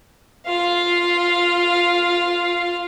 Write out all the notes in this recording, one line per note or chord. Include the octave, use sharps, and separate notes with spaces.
F4 F5